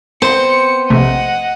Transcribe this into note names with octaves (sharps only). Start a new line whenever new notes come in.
B3 C4 C5 C#7
A#1 C3 A3 D#5 F#5